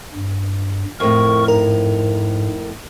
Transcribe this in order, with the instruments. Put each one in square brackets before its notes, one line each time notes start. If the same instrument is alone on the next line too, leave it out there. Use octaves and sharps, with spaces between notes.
[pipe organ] G2
[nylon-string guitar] F2 A2 [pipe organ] A#4 C#6
[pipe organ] G#2 [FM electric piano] A#4